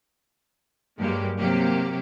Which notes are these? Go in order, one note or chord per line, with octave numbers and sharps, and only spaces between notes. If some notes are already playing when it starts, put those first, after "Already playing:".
G2 F#3 G#3 A#3 G4
C3 F#3 A#3 G4